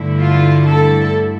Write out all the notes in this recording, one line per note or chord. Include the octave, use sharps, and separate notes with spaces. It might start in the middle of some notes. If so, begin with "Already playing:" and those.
Already playing: G2 D3 A3 E4
F4
A4